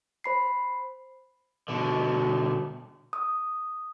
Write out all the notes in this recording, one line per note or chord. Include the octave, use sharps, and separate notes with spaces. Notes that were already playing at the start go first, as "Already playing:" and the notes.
C5 B5 C7
B2 D3
D#6